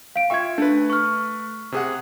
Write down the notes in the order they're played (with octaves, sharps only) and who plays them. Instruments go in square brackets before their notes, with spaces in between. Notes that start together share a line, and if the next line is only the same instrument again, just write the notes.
[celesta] F5 D7
[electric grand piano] F4 E5 C#6 [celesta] G5 G#6
[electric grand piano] A3 B4 [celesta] D4
[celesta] C#6 F6
[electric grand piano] C3 G#4 F#5